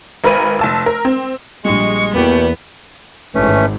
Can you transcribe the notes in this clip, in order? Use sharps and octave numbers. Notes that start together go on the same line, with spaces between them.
G#1 A#4 B4 B5 D#7
F1 A5 E6
A#4
C4
A#1 G3 G#3 C#6
E2 B2 A#3 B3 G4
G#1 G#2 E3 A3 C#4